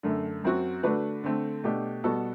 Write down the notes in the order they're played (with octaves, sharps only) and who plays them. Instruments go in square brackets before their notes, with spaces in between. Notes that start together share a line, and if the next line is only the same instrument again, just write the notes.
[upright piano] F#2 D3 A3
F#2 F#3 C4 F#4
D3 A3 D4 F#4 B4
D3 A3 C4
B2 A3 D4 G4
B2 G3 B3 F#4 A4